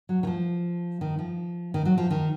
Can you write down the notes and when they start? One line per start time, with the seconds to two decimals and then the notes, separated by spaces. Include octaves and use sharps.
0.09 F#3
0.23 D#3
0.27 F3
1.01 D#3
1.19 F3
1.74 D#3
1.85 F#3
1.98 F3
2.10 D#3